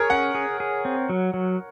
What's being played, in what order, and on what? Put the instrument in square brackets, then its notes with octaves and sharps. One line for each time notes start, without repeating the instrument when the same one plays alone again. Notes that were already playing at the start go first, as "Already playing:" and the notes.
Already playing: [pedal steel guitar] G#4 [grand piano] A#4 C#5
[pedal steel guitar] C#4 [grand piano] F#5
[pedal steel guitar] G#4
G#4
C4
F#3
F#3